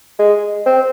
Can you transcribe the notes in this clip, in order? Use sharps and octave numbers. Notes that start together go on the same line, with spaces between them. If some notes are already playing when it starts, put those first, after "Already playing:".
G#3
C4